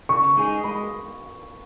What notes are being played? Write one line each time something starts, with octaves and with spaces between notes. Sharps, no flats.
C#3 C#6
G#3 D#4 G#4
G#3 B5